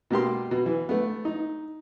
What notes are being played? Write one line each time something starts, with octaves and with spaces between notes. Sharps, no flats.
B2 A#3 G4 C6
B2
E3
A3 B3
D#4